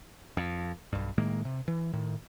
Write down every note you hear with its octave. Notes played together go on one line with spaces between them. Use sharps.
F2
B1 G2
A2 D#3 G#3 A#3
C3
E3
A2 D#3